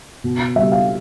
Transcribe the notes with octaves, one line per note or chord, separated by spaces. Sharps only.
B2
G3 E5
F5